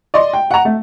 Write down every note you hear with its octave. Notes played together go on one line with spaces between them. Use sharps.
D5 D#5 C6
G5
F#5 A#5
A3